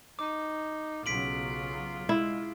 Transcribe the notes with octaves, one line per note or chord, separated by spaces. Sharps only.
D#4 D6
B1 C#3 F#3 F4 B6 D7 F#7
G#3 E4